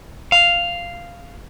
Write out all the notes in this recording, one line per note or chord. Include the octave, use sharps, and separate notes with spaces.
F5